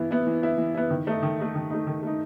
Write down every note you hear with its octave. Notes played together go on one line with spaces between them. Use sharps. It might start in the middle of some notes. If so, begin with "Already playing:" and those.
Already playing: E3 B3 E4
B3 E4
E3
B3 E4
E3
B3 E4
D#3
A3 D#4
D#3
A3 D#4
D#3
A3 D#4
D#3
A3 D#4